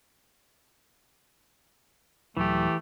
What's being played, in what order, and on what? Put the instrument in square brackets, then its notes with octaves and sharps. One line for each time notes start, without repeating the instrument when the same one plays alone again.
[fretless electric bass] D#1 F#3 [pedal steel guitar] E3 G4 [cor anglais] A3